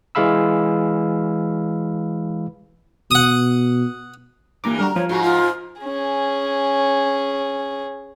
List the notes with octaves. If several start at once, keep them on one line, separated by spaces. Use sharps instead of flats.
E3 G#3 G#4 F5 B5 E6
B2 F#5 D#6
G2 A#2 E3 A#5 D6
D3 G3 F#4 A#4
F3 C#5
G#2 A#3 F#4
F4
C#4 G#4